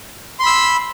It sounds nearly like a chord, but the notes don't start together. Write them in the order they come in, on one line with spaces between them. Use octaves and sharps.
C6 B5 E6